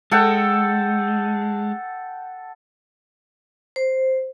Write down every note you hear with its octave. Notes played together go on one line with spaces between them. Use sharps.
G#3 A4 F#5 G5
C5